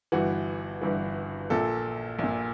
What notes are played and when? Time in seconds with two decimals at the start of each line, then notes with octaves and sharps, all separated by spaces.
0.12 G1 G2 E3 F#4
0.82 G1 G2 E3
1.50 A#1 A#2 A4
2.19 A#1
2.24 A#2